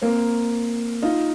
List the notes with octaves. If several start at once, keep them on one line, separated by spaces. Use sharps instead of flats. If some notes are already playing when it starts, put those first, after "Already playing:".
A#3 C4
D#4 F4